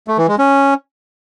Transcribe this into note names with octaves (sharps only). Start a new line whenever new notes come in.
A3
E3
G#3
C#4